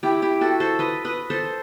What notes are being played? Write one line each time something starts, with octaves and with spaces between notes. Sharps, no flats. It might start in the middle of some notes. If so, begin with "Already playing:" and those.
E4 G4 G5
E4 G4
F#4 A4
A4 C5
B4 D#5
B4 D#5
A4 C5